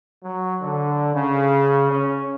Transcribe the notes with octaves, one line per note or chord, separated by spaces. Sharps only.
F#3
D3
C#3
C#4